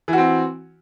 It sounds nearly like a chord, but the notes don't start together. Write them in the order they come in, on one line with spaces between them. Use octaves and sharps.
E3 F#4 C4